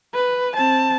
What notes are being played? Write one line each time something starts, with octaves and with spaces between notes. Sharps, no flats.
B4
C4 A5